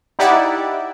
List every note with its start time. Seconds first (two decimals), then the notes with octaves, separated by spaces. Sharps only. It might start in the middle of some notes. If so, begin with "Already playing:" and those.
0.19 D#4 E4 G4 D5 E5 F#5